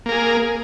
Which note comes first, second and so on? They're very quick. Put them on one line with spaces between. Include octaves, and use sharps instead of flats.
A#3 A#4 G#4